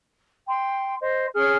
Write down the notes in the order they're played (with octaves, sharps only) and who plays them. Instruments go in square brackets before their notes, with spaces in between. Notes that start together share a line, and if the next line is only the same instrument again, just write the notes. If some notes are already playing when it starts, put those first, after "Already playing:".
[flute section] G5 C6
C5 D#5
C#4 G#4 F6